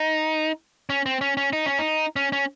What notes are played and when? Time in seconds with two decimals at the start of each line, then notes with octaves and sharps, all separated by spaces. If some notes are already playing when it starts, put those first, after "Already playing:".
Already playing: D#4
0.90 C#4
1.06 C4
1.21 C#4
1.37 C#4
1.53 D#4
1.66 C#4
1.78 D#4
2.16 C#4
2.32 C#4